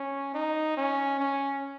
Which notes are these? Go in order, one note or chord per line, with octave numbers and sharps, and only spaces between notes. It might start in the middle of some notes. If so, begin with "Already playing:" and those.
Already playing: C#4
D#4
C#4
C#4